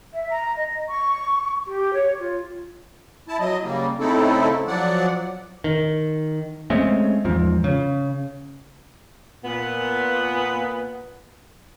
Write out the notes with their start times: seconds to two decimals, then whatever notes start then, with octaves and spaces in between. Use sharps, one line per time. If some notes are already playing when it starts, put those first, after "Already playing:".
0.14 E5
0.30 A#5
0.57 D#5
0.88 C#6
1.67 G4
1.93 C#5
2.20 F4
3.28 E4 A5
3.40 F#3 D#5
3.63 C#3 G3 A#3
4.00 C#3 A3 C4 D#4 E4 A4
4.67 F3 F#3 D5 F#5
5.64 D#3
6.70 G#3 A3 C4 C#4
7.25 E2 G#2 F3
7.64 C#3
9.44 A#2 B3